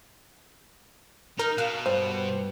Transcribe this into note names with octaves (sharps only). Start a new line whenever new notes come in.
D#4 A#4
B2 F5 F#6
G2 C5